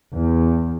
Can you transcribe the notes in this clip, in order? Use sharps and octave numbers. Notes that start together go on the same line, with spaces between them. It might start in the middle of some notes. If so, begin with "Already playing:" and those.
E2